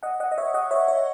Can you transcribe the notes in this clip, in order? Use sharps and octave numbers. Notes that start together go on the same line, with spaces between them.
D#5 F#5
D#5 F#5
D#5
C#5 E5
D#5 F#5
C#5 E5
C#5 E5